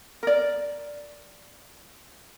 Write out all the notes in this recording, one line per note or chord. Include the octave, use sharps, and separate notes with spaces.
A#4 D5